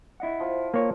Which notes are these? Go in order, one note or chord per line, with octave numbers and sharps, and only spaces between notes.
E4 D#5 F#5
F3
A#2 A#3 C#5